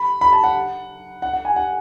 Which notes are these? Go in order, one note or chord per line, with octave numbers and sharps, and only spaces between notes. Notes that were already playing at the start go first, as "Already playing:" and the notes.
Already playing: B5
B5
A5
F#5
F#5
F#5
G#5
F#5